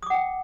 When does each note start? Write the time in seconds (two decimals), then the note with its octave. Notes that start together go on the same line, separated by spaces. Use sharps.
0.03 D#6
0.06 D6
0.10 F#5
0.14 G5